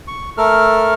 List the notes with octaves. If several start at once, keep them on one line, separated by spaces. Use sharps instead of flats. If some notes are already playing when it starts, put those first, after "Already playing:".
C#6
A3 A4 A#4 F6